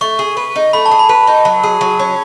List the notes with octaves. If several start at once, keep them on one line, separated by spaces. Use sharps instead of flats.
A3 C#6
G#4
B4
D#4
A3 B5
A5
G#4
B5
B4
D#4
F#3
G#4
F#3
C#4